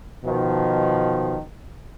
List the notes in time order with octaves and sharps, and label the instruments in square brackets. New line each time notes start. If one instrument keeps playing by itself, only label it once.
[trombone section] B2 D#3 F3